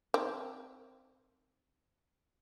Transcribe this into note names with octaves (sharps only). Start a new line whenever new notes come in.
D#3 C4